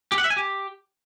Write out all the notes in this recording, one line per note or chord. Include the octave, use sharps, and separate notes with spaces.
G4
F#5
E5
G#5
G4